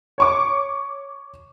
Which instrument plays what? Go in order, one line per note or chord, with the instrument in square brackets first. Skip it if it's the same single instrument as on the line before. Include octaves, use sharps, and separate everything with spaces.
[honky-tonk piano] C#5 C#6 D6